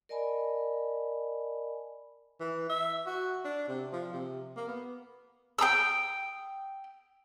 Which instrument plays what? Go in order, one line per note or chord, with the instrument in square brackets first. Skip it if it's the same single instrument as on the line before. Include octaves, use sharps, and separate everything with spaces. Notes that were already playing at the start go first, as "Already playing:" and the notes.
[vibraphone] A#4 D5 D#5 G#5 A5 B5
[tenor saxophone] E3
E5
F#4
D4
C3
F3
C3
A#3
B3
[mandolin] G5 A#5 D#6 E6